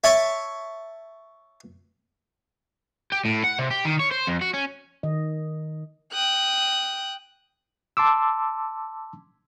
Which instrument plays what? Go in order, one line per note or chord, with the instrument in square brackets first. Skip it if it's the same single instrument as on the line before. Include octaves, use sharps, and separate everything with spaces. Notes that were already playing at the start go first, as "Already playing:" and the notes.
[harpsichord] C#5 E5 A5 C#6
[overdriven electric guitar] G4
A2
F#5
C3
G4
D#3
C#5
C5
F2
F#4
C#4
[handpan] D#3 D#5
[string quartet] G5 D#6 F#6
[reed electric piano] A5 C6 D6 E6